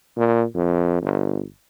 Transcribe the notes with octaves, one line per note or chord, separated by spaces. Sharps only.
A#2
F2
G1